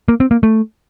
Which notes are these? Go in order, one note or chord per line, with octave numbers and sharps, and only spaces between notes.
A#3
C4
A#3
A3